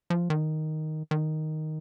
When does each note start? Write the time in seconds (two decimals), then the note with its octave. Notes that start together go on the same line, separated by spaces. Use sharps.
0.10 F3
0.30 D#3
1.11 D#3